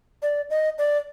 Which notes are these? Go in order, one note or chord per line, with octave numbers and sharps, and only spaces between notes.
D5
D#5
D5